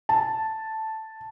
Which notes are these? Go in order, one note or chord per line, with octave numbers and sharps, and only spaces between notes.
A5